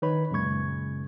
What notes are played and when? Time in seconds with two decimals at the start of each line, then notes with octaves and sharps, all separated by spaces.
0.02 D#3 D#4 B4 C#5 B5
0.31 F#2 A#2 C#3 G#3 C#6 G#6